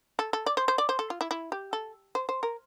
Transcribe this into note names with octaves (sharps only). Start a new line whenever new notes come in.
A4
A4
D5
C5
C5
D5
C5
A4
F4
E4
E4
G4
A4
C5
C5
A#4